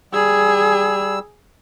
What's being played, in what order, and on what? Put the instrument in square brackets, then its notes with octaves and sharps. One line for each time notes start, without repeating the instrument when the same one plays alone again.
[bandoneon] G3 E6 [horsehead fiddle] G#4